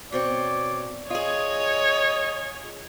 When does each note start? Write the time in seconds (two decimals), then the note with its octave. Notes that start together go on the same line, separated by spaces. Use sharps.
0.12 B2 C4 C#5 D5
1.10 F4 G#4 C#5 D#5